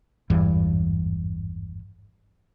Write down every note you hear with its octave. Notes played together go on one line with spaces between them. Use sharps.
G#1 E2 G2 E3